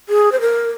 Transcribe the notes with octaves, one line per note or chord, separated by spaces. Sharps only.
G#4
C5
A#4